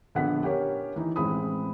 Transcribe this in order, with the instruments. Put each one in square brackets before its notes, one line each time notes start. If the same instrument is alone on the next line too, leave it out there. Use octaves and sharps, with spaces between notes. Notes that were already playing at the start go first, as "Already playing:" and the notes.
[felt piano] A#1 D3 B3 D4 F#5 B6
C#4 G4 A#4 C#5
E3 D#4
A1 G#3 C4 B5 D#6